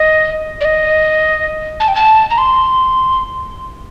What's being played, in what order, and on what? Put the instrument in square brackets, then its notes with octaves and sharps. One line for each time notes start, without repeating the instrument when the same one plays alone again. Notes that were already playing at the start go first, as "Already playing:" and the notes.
Already playing: [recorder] D#5
D5
D#5
A5
G5
A5
A#5
C6